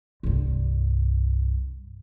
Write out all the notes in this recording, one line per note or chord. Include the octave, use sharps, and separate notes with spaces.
C2 G2